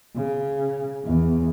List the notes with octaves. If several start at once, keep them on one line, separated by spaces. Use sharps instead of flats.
C#3
E2